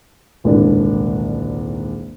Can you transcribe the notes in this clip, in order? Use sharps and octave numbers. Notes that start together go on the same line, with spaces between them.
D#1 C2 G#2 D3 D4 D5